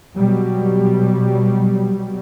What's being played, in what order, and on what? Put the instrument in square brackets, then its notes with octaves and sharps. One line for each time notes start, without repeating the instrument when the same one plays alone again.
[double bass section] B2 F#3 G3